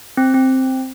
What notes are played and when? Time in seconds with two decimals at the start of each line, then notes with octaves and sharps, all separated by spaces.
0.17 C4
0.34 C4